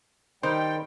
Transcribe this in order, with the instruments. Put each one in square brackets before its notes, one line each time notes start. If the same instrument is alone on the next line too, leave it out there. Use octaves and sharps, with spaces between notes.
[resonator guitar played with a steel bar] D#3 [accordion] G3 G5 [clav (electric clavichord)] C5